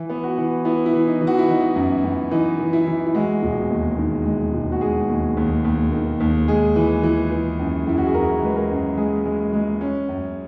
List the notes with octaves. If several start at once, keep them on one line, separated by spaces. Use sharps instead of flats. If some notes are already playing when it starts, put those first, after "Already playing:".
Already playing: E3 E4
B3
F#4
E3
B3 E4
E4
E3
D#4
E3
F#4
E4
E3 D#4
E4
F#2
F#2
E3 D#4
E3
E4
E3
E4
G#3 F#4
E1
D#2
D#3
G#3
E1
F#4
G#3 G#4
D#2
D#2
D#2
D#3
D#2
G#3 G#4
E3
E3
E3
F#2
F#2 E4
F#4
G#4
F#2 A#4
G#3 B4
A#4
F#2
G#3 G#4
G#3
G#3
C#4
F#2